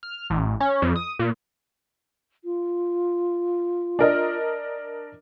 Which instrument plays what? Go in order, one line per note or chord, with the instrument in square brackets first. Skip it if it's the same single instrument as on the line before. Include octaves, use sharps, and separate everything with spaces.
[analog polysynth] F6
A1
C#4
F2
D#6
A#2
[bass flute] F4
[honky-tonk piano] D4 A#4 D#5